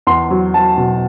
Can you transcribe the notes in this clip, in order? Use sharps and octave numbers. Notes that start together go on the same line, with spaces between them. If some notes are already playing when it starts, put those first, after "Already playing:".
E2 C6
F#3
F#3 A5
B2